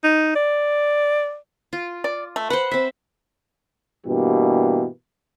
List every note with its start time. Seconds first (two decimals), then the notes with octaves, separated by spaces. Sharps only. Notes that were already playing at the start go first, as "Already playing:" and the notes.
0.04 D#4
0.35 D5
1.73 F4
2.04 D5
2.36 A3
2.50 B4 C5 F#5
2.71 C4 E5
4.06 G2 B2 E3 A#3 G4